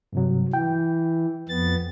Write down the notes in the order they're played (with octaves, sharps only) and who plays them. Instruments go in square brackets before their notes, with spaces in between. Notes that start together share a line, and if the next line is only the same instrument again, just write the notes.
[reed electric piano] G2 C3 F#3
[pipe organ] E3 [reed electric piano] G5
[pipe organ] F2 B3 A6